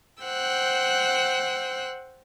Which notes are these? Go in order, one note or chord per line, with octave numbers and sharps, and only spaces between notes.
C5 F#5 G5 E6 F#6